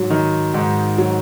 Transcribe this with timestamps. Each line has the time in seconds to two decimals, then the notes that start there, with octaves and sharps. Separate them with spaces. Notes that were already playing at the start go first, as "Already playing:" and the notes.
Already playing: G#2 F#3
0.10 D#3
0.54 G#2
0.98 F#3